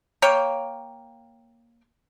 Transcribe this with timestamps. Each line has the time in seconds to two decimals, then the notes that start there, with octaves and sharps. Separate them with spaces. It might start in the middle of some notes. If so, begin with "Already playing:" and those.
0.22 A#3 C#5 F5 G5